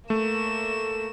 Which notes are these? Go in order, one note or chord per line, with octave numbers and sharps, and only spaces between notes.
A3 A#3 E7